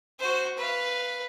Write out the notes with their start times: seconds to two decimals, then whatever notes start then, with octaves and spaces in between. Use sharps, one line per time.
0.19 F#4 C5
0.57 B4 F5